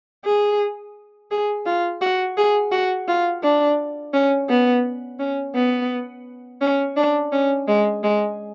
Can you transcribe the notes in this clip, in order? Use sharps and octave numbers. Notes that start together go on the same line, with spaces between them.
G#4
G#4
F4
F#4
G#4
F#4
F4
D4
C#4
B3
C#4
B3
C#4
D4
C#4
G#3
G#3